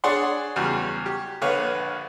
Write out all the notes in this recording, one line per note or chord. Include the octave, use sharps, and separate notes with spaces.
D4 G#4 C#5 D5 F#5 C6
E2 C#3 F#3 G3
G4
A#1 D3 B4 C#5 F5